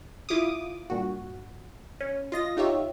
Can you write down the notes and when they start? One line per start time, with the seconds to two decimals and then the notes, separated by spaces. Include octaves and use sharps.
0.29 E4 F4 D6 D#6
0.90 G2 A#2 F#4
2.01 C#4
2.32 F4 D#5 A#6
2.57 D#4 F4 G4 C#5 E5